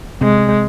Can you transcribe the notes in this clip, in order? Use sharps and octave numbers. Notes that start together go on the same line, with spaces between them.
C3 G#3 C4